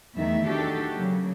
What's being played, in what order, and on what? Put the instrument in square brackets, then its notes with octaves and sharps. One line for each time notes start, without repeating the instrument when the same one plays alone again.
[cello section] E2 D#3 G3 A3 E5
D#3 D4 F#4 G4 A4
C#3 F#3 A#3